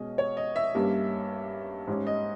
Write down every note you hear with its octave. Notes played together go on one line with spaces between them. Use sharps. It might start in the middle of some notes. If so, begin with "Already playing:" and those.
Already playing: B2 G#3 C#4 D#5
C#5
D#5
E5
G2 G3 A#3 C#4
G#2 G3 C#4
D#5